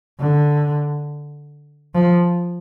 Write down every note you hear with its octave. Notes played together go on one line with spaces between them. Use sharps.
D3
F3